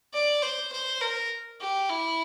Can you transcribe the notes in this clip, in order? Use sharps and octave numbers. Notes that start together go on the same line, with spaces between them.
D5
C5
C5
A#4
G4
E4